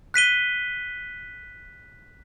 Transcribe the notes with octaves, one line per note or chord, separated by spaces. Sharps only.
F#6 B6 D#7 G7